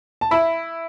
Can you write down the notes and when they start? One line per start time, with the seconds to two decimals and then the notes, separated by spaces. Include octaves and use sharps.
0.21 A5
0.31 E4 B5